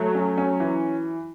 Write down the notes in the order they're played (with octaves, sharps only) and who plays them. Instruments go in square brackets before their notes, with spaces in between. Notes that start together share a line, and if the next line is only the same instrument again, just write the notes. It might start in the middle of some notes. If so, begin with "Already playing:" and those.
Already playing: [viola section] F#3 [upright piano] A3
[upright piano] C#4
C#4
E3